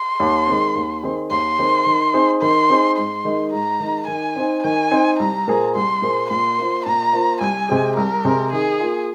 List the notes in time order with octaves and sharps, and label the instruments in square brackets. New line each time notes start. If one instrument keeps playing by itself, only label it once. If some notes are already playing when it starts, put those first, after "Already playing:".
Already playing: [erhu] C6
[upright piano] D#2
D#3 G#3 C4
D#2
D#3 C4 G#4 C5
[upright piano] D#2 [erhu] C6
[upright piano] D#3 C4 G#4 C5
D#3
C4 D#4 G#4 C5
[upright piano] D#3 [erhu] C6
[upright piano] C4 D#4 G#4 C5
[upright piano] G#2 [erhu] C6
[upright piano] D#3 G#3 D#4
[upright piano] G#2 [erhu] A#5
[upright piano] D#3 G#3 D#4
[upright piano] D#3 [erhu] G#5
[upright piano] C4 D#4 C5
[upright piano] D#3 [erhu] G#5
[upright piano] C4 D#4 C5
[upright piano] C2 [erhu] A#5
[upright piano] A#2 A#3 G#4 C5
[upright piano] C2 [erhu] C6
[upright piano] A#2 A#3 G#4 C5
[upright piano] A#2 [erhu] C6
[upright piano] A#3 F4 C5
[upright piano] A#2 [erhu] A#5
[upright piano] A#3 F4 C5
[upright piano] C2 [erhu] G#5
[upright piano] C3 G#3 C4 G#4
[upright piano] C2 [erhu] A#4
[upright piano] C3 G#3 C4 G#4
[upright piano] D#3 [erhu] G#4
[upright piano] A#3 F4